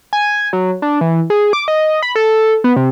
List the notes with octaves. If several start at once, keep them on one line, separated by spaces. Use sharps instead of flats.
G#5
F#3
D4
E3
G#4
D6
D#5
B5
A4
B3
C3